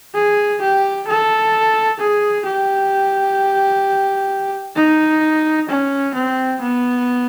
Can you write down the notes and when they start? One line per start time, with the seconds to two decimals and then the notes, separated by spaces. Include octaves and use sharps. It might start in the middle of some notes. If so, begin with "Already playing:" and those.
0.14 G#4
0.62 G4
1.08 A4
1.99 G#4
2.45 G4
4.76 D#4
5.69 C#4
6.14 C4
6.61 B3